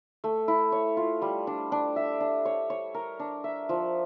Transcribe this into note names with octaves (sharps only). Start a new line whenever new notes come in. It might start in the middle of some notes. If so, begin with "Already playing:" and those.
A3
E4
C#5
F4
G3
D4
D4
E5
D4
C#5
C#5
A#4
D4
E5
F3